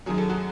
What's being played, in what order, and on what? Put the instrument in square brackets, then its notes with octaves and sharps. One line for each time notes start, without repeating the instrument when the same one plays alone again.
[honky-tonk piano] F#2 D#3 F#3 G#4
A4
F#4 G#4